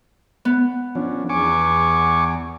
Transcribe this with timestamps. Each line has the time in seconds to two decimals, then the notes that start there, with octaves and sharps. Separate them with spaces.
0.45 B3
0.95 F3 C#4 D4
1.29 E2 G#5 C#6 D6